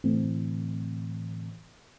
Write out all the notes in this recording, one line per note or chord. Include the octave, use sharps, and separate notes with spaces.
A2 D3 E3 A3 C4